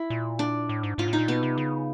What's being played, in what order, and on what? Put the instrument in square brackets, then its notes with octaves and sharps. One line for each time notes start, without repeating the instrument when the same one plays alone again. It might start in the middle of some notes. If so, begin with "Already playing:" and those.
Already playing: [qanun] E4
[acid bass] A#2
[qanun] D4
[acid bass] A2
G#2
[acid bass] G#2 [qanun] F4
[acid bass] A2
[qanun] D#4
[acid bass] A#2
[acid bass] B2 [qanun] B3
[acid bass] C3
C#3